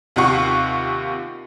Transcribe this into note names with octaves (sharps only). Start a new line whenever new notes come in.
D#2 C3 D#4 F4 F#5 C#6